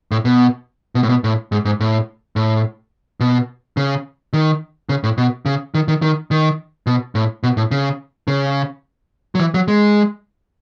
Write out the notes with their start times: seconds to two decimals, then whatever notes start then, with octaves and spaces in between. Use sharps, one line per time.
0.11 A2
0.25 B2
0.95 B2
1.03 A2
1.09 B2
1.24 A2
1.52 G#2
1.65 G#2
1.80 A2
2.36 A2
3.20 B2
3.77 C#3
4.33 D#3
4.89 C#3
5.04 A2
5.18 B2
5.46 C#3
5.74 D#3
5.88 D#3
6.02 D#3
6.31 D#3
6.87 B2
7.15 A2
7.43 B2
7.57 A2
7.71 C#3
8.28 C#3
9.35 F#3
9.40 E3
9.54 F#3
9.68 G#3